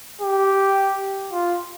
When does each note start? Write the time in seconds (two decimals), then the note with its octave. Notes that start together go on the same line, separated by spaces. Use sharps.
0.22 G4
1.32 F4